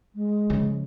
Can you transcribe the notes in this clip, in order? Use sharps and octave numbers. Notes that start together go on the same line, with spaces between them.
G#3
C#3 F3